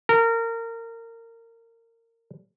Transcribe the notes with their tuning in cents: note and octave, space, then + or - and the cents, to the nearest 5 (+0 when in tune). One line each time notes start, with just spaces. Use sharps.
A#4 -25